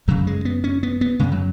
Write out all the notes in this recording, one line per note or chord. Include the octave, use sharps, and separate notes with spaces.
F#2 C#3 F#3
G#3
B3
C#4
B3
B3
F#2 C#3 G#3
F#3